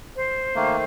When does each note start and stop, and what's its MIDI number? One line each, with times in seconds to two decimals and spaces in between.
0.16 0.85 72
0.55 0.85 51
0.55 0.85 57
0.55 0.77 58